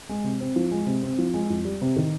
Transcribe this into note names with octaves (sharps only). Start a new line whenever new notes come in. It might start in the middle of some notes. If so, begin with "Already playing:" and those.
G#3
C3
C4
F3
G#3
C3
C4
F3
G#3
F2
G3
C3
D#3